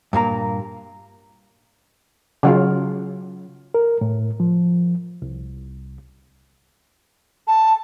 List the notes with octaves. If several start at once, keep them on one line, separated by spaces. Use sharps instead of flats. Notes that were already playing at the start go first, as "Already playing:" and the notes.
G2 A#2 A#3 A#5
C#3 F#3 F4
A#4
A2
F3
C2
A5